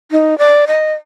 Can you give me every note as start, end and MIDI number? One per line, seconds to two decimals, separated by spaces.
0.11 0.38 63
0.38 0.65 74
0.67 0.93 75